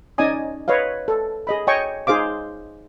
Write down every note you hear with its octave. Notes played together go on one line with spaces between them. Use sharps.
C#4 D#4 D5 D#5 G#5 D#6
B4 C#5 D#5 F5
A4
G#4 D#5 B5
C#5 D#5 G5 G#5 C#6
D#4 G#4 C5 F5 D6